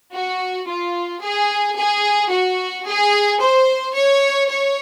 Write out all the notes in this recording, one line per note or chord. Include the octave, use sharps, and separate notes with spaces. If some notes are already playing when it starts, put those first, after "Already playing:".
F#4
F4
G#4
G#4
F#4
G#4
C5
C#5
C#5